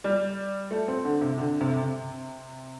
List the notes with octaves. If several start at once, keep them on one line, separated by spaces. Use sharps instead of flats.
G3
A3
C4
D3
C3
D3
C3
C3